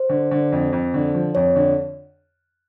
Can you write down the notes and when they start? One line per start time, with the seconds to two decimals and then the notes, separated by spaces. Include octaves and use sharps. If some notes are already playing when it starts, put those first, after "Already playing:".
Already playing: C5
0.09 D3
0.31 D3
0.52 F2
0.72 F2
0.94 D3
1.14 F3
1.35 F2 C#5
1.56 D3